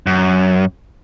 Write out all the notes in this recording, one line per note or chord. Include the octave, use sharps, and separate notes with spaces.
F#2